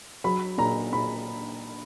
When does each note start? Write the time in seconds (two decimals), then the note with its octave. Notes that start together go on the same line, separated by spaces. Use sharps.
0.24 F#3 B5
0.58 A#2 A#5
0.92 A#2 B5